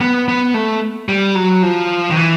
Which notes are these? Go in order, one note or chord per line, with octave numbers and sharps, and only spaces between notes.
B3
B3
A3
G3
F#3
F3
D#3
E3